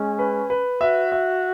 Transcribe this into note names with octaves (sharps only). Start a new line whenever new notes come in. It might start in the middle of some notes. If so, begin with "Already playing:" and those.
Already playing: G#3 C#4
B4
B4
F#4 E5
E5